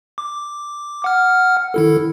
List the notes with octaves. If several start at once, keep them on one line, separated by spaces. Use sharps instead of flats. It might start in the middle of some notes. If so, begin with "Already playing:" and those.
D6
F#5 F6
D#3 E4 A4